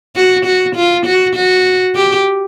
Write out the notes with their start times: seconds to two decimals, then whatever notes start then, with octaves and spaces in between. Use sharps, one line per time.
0.16 F#4
0.45 F#4
0.75 F4
1.06 F#4
1.36 F#4
1.95 G4